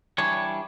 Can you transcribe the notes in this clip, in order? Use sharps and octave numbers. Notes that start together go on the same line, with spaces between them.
E3 G3 D4 C#5